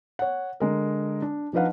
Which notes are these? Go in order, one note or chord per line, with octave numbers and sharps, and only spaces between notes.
C#5 F#5
D3 G#3 A#4
D4
F3 D4 D#4 B4 F5 F#5